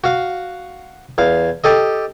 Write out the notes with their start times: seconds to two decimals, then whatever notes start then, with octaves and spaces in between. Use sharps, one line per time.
0.04 F#4 F5
1.18 E2 F5
1.64 G4 A4 D#5